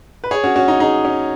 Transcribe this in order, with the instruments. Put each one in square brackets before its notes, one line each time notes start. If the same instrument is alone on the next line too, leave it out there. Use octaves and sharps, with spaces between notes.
[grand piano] B4
G#4 C#5
C#4 F#4
C#4 F#4
D#4
D#4 G#4
C#4